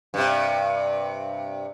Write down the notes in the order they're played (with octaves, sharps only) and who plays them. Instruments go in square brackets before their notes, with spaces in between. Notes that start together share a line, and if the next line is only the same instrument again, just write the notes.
[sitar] G2 C3